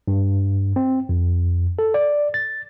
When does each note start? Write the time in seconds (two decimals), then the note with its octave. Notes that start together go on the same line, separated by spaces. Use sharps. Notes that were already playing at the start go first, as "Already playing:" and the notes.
0.08 G2
0.76 C4
1.09 F2
1.79 A4
1.94 D5
2.34 A6